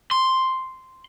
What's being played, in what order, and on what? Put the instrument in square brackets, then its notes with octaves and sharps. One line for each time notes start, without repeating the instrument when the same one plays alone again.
[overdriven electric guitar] C6